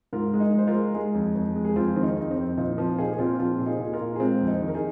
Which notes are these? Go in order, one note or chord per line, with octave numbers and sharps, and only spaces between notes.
G#2 F4 A#4
G#3
D#4
G#3 C5
F4 A#4
G#3
G#3 D#4 G#4
F2
F2
G#3
G#4
F2 C4 F4
D#3 C4
D#4
F2 D#4
C4
F2
A#2 D#4
F3 C4 F4
A#2 D#4 G#4
G#4
A#2 C4 F4
F3 C4 F4
A#2
D#4 G#4
A#2
G#4
F4 A#4
A#2
G#4
G#3 C4 F4
F2
D#4
D#3
A#4
D#4 G#4